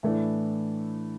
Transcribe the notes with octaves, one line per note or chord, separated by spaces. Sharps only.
A2 E3 A3 D4